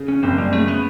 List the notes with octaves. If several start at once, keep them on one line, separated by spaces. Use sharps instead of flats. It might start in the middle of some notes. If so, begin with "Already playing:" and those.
Already playing: C#3
C#4
F#1 C4
G3
C#3 A3
B3